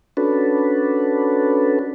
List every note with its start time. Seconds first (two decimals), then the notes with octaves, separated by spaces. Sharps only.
0.17 C#4 D4 F#4 A4 B4